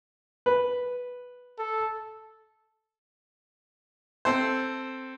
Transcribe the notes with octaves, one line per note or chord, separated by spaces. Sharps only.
B4
A4
C4 A4 C5